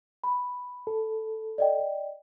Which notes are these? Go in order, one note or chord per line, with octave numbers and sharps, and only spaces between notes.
B5
A4
D5 D#5 G5